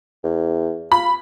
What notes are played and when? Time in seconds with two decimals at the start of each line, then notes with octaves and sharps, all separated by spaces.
0.24 E2
0.92 F4 B5